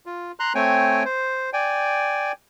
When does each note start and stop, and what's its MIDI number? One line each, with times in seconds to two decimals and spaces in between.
0.06 0.32 65
0.40 0.53 82
0.40 0.53 84
0.40 0.53 90
0.55 1.03 57
0.55 1.03 60
0.55 1.03 73
0.55 1.03 79
0.55 1.03 80
1.05 1.50 72
1.53 2.32 74
1.53 2.32 79
1.53 2.32 80